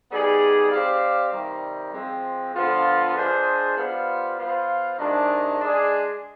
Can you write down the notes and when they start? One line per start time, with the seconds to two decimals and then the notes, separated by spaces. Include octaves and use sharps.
0.11 G3 B3 D#4 G#4 D5
0.71 C4 G4 D5 F5
1.32 C3 D#3 G3
1.94 F3 G#3 C4
2.54 D3 F3 B3 F4
3.16 G#3 D4 F4 G#4 C5
3.77 G3 B3 F4 C5 F5
4.38 B3 F4 C5 F5
4.98 C3 D#3 G#3 D4
5.60 G#3 D4 G#4 D5